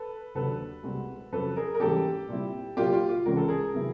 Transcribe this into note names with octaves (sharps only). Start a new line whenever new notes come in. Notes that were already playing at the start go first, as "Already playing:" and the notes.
Already playing: A4 B4
D#2 D3 F#3 A4 B4
C2 B2 G#3 C4
F2 C#3 F#3 A4 B4
G#4 A#4
A#4
G#2 E3 G3 A#3 C#4 G4 A4
A#2 G3 C4 E4
A#2 F#3 A#3 F4 G4
F4
F4
C#2 C#3 E3 G#3 C#4 A#4
A4
G#4 A#4
C3 D#3 F#3 B3 E4